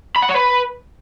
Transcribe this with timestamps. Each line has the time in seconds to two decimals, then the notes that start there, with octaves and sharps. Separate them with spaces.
0.16 B5
0.22 F#5
0.29 C#5
0.36 B4